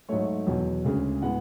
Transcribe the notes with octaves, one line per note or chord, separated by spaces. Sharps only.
G#2 F#3 A3 C#5
E2 B2 F#3
D2 C#3 G#3
A2 G#3 B3 F#5